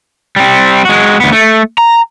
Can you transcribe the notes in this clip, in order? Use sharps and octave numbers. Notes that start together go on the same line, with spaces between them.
G3 C4
G#3 F#4
D2 B3
A3
A#5